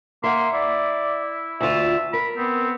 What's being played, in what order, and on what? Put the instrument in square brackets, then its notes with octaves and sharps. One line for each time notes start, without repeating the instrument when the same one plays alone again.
[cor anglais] A#3 [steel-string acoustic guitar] E5 F#5 [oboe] C6
[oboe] E4 [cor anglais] D5
[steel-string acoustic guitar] D2 F4 [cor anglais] E5
[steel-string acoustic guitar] A#4 [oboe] B5
[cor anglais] B3 [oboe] C4